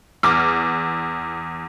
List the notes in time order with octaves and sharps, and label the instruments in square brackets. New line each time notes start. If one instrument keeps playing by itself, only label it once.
[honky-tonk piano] E2 D6 F6